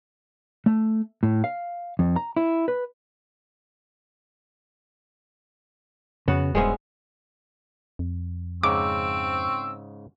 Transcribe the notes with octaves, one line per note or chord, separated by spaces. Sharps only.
A3
A2
F5
F2
A#5
E4
B4
F2 C#3 B3 F#4
D#1 G2 G#3 B3 C#4 C5 E5
F2
G#2 C#3 C4 C#6 D6 E6